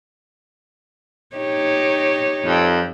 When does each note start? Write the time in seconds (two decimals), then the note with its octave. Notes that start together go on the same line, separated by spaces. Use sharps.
1.36 D#4 G4 C#5
2.46 F2